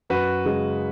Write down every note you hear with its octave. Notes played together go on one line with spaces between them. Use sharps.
F#2 F#4 B4
C#3 G#3